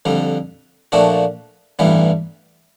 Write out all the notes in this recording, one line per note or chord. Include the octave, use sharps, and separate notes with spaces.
F2 D3 G3
A#2 F3 A3 D4 F#4
A1 G2 E3 G3 B3